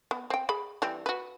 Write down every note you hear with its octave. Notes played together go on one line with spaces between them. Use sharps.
B3
C4 G5
G#4 B5
E3 G3 C4
F#4 B4